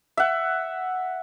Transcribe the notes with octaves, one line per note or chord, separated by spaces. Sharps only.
E5 F#5